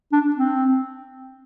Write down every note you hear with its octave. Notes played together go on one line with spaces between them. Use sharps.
D4
C4